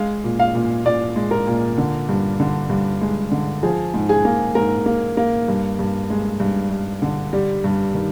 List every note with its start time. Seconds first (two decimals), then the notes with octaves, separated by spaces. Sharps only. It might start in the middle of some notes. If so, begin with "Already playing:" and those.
Already playing: G#3 F5
0.24 A#2
0.39 F5
0.55 A#2
0.85 A#2 D5
1.16 G#3
1.31 A#4
1.47 A#2
1.78 D3
2.09 G2
2.40 D3
2.70 G2
3.01 G#3
3.32 D3
3.63 F3 G#4
3.94 G#2
4.09 G#4
4.25 A#3
4.55 G#2 A#4
4.86 A#3
5.17 A#3
5.48 G2
5.79 G2
6.10 G#3
6.40 G2
6.70 G2
7.02 D3
7.33 G3
7.64 G2
7.94 D#3